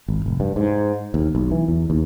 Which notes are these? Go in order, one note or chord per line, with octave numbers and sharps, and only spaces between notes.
G#1
F1
G2
G#2
D#2
B1
E3
E2
D#2